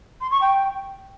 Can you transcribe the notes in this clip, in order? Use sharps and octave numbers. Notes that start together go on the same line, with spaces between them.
C6
C#6
G5